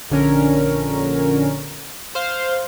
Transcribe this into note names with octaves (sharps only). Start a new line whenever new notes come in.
A#1 D3 C#4 A#4
C5 F5